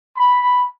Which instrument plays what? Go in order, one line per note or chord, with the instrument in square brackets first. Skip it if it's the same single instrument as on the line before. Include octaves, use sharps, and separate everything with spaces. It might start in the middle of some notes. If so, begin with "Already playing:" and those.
[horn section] B5